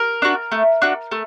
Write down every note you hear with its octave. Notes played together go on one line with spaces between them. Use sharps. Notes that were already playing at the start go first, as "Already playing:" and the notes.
Already playing: A#4
D4 F#4
A3
D4 F#4
A3